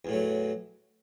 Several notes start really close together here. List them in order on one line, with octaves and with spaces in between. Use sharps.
E2 A2 F#3